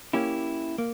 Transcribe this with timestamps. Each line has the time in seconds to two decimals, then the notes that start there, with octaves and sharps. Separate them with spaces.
0.13 A#3 C#4 E4 G4
0.78 A#3